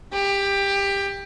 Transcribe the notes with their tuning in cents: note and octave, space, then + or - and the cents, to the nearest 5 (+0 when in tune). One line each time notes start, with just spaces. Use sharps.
G4 +20